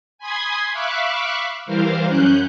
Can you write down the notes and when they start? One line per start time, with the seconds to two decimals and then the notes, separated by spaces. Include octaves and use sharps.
0.18 G#5 B5 C6 D#6 G#6
0.73 E5 F5 B5 C#6 D6 F#6
1.66 E3 G3 A#4 C5 F5
2.08 F#2 C#4 F#6 G6